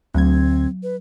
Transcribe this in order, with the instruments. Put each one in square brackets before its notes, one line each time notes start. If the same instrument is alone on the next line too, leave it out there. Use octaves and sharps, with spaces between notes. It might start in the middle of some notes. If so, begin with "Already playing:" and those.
[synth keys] D2 G#6 [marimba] F#3 [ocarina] C4
[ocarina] B4